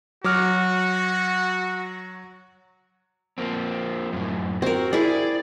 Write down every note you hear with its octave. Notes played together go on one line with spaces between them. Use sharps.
F#3 F#4 D6 F6
F3 A#3 C4
F#2 A2
C4 F#4 A#4
E4 G#4 D5